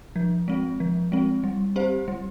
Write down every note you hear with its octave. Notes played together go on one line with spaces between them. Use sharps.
F3
G#3 C4
F3
G#3 C4
G3
C4 G4 C5
G3